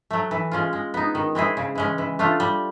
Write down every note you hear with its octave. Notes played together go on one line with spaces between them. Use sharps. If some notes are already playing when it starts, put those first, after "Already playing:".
F#3 A3
E3
G#3 C#4 F4
G#3
B3 D#4
D#3
G#3 C4 E4 G#4
C#3
E3 G#3 C#4
E3
A3 D4 F4
G3